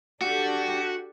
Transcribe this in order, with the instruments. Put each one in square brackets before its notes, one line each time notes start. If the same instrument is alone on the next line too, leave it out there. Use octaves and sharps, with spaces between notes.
[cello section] D4 G4 A4 [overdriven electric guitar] F#4